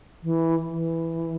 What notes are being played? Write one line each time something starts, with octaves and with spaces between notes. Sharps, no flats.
E3
E3